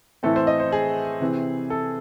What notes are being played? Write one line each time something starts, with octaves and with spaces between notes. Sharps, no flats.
A2 E3 A3 C4 A4
C5
D#5
C5
G#4
C3 E3 C4
A4